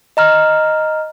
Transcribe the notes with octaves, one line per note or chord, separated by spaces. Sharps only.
D#5 A#5 F6